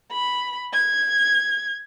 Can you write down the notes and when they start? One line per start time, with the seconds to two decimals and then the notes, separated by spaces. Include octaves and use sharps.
0.12 B5
0.73 G#6